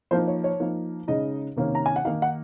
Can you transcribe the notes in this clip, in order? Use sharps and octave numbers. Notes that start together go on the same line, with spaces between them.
F3 A#3 D#4 C5
C#5
C#5
F3 A#3 D#4
C#3 G#3 D#4 D#5
C3 D#3 A#3 C#4
A#5
G#5
F#5
D#3 A#3 D#4 F5
F#5